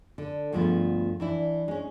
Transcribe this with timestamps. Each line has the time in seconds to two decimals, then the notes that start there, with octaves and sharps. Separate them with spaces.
0.18 D3
0.52 D2 G2 F3 G#3 B3
1.20 E3 D4 E4
1.68 G#3 C#4